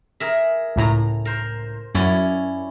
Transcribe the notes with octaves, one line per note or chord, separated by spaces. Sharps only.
G#4 A#4 E5
C#2 A2 A#5
A#4 C5
F#2 C#4 E4 D5